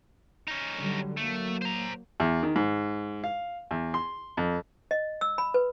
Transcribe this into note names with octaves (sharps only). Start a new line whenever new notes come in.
C#4 D#4
D3 F#3 G3
F#3 A3 A#3
C5 A#5
E2
D#3
G#2
F5
E2
C6
F2
D#5
E6
B5
B4